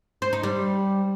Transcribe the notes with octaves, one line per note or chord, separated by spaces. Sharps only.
C5
D#4
G3